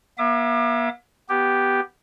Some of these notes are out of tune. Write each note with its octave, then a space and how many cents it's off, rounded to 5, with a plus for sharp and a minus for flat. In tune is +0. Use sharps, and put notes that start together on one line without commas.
A#3 +45 E5 +20 D6 +35
B3 +0 G4 +0